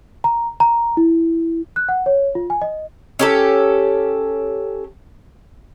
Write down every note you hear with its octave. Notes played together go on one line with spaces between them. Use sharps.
A#5
A#5
E4
F#6
F#5
C#5
F4
G#5
D#5
C#4 G4 A4